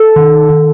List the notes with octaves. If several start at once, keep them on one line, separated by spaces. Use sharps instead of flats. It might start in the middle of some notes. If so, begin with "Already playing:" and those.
Already playing: A4
D#3
D#3